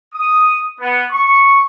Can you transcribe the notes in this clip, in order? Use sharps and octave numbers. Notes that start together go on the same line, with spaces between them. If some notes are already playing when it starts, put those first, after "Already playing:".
D#6
B3
C#6